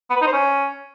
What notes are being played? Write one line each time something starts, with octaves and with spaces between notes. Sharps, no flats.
B3
B4
D#4
C5
C#4